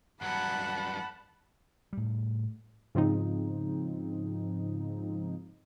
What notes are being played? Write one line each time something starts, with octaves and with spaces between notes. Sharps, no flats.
G2 F#3 F#5 A5 B5
A2 G3
G#2 C#3 F3 C4 D#4